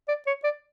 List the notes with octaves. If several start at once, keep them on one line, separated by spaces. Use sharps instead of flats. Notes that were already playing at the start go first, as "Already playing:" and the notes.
D5
C#5
D5